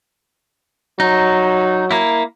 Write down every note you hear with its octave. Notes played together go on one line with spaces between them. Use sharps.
F#3 D#4
A#3 E4